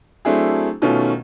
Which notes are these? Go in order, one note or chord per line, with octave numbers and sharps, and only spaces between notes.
F#3 A3 C4 D4 E4 G#4
B2 D#3 A3 C#4 F4